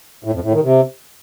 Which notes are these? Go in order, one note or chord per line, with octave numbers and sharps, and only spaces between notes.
A2
F2
A2
D#3
C3